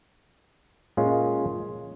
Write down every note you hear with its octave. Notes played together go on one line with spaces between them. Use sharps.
A#2 G#3 C#4 F4